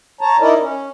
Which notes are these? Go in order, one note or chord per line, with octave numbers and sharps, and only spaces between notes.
C#5 A5 A#5
D#4 E4 A#4 D5 D#5
C#4